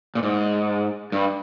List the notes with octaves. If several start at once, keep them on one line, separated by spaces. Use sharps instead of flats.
A#2
G#2
G2